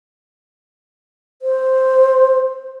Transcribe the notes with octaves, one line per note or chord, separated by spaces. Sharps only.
C5